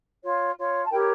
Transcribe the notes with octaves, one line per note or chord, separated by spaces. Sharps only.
F4 C#5
F4 C#5
A5
E4 G4 A#4 C#5 G5